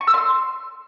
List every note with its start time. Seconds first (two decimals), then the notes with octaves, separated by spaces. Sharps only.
0.01 C#6
0.07 E6
0.14 C6